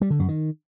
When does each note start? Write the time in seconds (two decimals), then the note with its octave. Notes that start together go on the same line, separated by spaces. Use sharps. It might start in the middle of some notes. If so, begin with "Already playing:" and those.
0.01 G3
0.10 D3
0.19 F#2
0.28 D#3